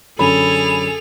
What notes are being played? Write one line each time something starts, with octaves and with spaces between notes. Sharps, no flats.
F#2 D3 C#4 G#4 A4 B5 F7